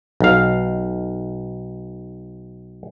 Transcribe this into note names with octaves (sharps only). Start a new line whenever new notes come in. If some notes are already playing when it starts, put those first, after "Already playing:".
B1 F5